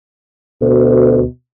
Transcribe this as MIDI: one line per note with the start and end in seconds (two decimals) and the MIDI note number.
0.61 1.22 38
0.61 1.25 47